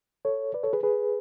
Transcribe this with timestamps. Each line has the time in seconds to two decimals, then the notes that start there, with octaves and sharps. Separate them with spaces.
0.25 A4 C#5
0.54 B4 D5
0.63 A4 C#5
0.73 G#4 B4
0.83 G#4 B4